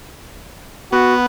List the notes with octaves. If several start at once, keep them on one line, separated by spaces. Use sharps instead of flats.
B3 F#4